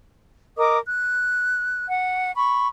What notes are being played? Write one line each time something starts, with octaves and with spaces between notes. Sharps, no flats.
A#4 D#5 D6 D#6
F#6
F#5
B5 C#6